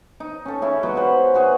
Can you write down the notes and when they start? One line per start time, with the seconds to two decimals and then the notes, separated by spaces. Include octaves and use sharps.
0.20 D#4
0.46 C#4 A4
0.62 C#4 E4 G#4
0.83 F#3 G#3 B3
0.95 F#4 G#4 C5 B5
1.34 B3 F#4 G#4 C#5